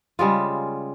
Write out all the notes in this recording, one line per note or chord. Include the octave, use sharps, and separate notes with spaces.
C#3 G3 G#3 F4